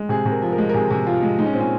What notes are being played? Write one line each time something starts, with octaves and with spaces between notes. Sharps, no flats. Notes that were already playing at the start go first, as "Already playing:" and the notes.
Already playing: G#3
C3 G#4
C3
A#4
F3
A#4
G#3
A#4
C3 G#4
C3
F3 F4
G#3
G#3 D#4
C#4
A#2 C4
C#4